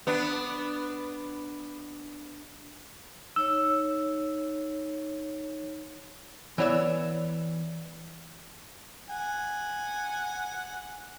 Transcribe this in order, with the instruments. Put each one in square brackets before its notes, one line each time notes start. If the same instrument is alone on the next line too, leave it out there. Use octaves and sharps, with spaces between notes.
[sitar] B3 D4
[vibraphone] D#4 C#5 [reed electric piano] E6
[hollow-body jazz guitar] E3 B3 C#5 D5 E5
[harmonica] F#5 G#5